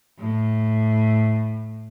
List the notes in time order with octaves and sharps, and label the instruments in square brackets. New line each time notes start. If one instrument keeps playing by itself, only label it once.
[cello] A2